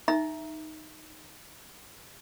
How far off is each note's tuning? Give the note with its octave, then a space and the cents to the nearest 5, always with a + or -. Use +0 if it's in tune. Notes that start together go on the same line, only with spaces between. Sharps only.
D#4 +0 E5 +0 A#5 +10